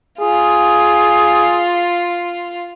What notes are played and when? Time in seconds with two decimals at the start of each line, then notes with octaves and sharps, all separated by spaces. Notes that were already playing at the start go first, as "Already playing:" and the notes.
0.20 F4 G#4